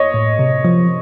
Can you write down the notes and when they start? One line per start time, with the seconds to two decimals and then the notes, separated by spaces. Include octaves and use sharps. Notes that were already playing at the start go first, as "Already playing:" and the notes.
Already playing: C#5 D#5
0.14 A2
0.39 C3
0.65 F3